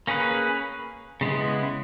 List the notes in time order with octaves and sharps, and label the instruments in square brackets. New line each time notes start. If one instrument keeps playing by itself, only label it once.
[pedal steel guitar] A#3 C#4 G#4 B4
C#3 G#3 B3 E4